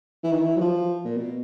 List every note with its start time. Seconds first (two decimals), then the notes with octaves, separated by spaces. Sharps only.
0.24 E3
0.32 D#3
0.40 E3
0.57 F#3
0.61 F3
1.05 A#2
1.17 B2